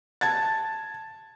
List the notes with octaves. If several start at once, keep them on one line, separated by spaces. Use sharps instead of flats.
A5 G#6 A6